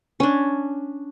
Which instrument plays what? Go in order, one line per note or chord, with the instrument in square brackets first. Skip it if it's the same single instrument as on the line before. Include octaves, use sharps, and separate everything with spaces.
[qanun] C#4 D4